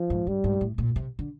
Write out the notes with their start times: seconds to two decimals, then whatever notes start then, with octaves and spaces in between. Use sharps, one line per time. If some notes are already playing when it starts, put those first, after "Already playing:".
Already playing: F3
0.10 G#2
0.27 G2 G3
0.44 G#2
0.61 A2
0.78 A#2
0.96 C3
1.19 D3